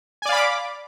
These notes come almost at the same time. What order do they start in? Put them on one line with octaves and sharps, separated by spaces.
G#5 D5 F5 B5 D6